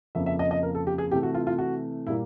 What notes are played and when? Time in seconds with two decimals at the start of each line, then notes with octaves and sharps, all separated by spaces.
0.15 F2 C#3 F3 A#3 E5
0.26 E5
0.39 D#5
0.51 D#5
0.63 A#4
0.75 A4
0.87 G4
0.98 G#4
1.11 C3 E3 A3 G4
1.23 F#4
1.34 F4
1.47 F4
1.58 F#4
2.07 A#2 G3 A#3 E4